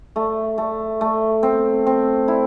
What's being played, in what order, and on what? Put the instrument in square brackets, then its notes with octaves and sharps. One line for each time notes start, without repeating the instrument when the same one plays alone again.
[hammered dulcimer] A3
A3
A3
C4
C4
E4